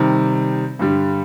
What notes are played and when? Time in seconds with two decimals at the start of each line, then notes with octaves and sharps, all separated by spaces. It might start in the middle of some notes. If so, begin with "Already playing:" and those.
Already playing: C3 D#3 G3
0.79 G2 D3 G3